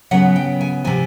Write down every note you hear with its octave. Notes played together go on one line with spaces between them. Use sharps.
C#3 F#3 B3 F#5
G5
G#5
C3 F3 G#5